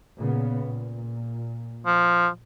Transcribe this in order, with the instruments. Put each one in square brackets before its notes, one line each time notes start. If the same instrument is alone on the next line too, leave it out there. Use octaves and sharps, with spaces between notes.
[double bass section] A#2 C#3 B3
A#2
[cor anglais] F3